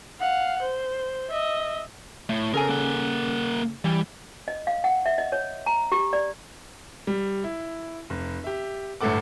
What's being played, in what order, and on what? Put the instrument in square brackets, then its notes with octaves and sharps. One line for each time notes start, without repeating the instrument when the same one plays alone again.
[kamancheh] F5 F#5
C5
D#5 E5
[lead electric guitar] A2
[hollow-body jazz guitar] C#3 A4 G#5 [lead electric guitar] A#4
[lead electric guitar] A#3 F#5
[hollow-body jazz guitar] E3 [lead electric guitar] G3
[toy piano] D#5
F5
F#5
E5
D#5
C#5
A#5
G4
D5
[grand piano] G3
E4
F1
G4 E5
G1 A2 E4 A4 F#5 D6